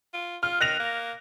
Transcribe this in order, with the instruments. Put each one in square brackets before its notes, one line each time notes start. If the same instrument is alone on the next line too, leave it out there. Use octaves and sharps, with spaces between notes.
[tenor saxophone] F4
[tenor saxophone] F4 [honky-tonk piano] F6
[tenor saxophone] D#3 [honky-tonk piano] F#6 A#6 F7
[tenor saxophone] A#3